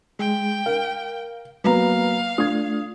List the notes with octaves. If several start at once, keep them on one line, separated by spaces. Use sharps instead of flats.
G#3 G5
A#4 F5
F#3 A#3 B3 B4 F5 A#5
A3 D4 F4 D#6 G#6